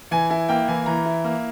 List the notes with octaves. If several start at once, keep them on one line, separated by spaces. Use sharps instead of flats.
E3 G#5
E4 G#5
A#3 G5
E3 G#5
E3 A#5
E4
A#3